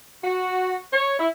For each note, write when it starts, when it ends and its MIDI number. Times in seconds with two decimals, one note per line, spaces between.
0.24 0.77 66
0.93 1.16 73
1.20 1.28 64